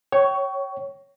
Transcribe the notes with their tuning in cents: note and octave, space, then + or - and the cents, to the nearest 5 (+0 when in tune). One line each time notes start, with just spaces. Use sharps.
C#5 +0 G5 -35 C#6 +15